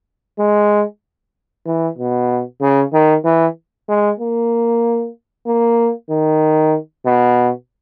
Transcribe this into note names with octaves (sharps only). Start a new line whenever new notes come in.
G#3
E3
B2
C#3
D#3
E3
G#3
A#3
A#3
D#3
B2